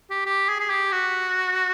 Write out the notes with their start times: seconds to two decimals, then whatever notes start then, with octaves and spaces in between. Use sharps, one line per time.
0.11 G4
0.26 G4
0.49 G#4
0.60 G#4
0.70 G4
0.92 F#4